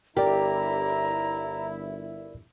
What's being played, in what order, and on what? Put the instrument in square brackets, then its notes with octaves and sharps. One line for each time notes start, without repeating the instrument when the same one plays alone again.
[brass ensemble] G1 E4 [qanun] G4 [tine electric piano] A#4 D5 [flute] A#5